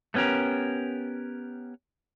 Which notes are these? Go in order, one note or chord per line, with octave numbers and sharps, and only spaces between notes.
A3 B3 C#4 G4 A#4